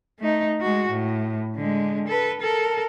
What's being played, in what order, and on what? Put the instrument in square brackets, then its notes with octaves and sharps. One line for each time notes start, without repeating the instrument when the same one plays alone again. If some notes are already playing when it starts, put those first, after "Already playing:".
[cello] A3 D#4
G#3 F#4
A2
D3 G#3
A4 B4
A4 A#4